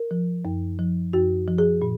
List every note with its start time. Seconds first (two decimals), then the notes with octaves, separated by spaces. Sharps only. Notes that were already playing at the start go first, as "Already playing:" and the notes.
Already playing: A#4
0.11 F3
0.45 F#2
0.79 F3
1.13 F#2 F#4
1.48 F3
1.58 G#4
1.82 A#2